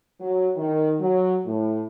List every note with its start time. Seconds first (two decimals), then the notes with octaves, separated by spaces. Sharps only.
0.20 F#3
0.56 D#3
0.99 F#3
1.46 A2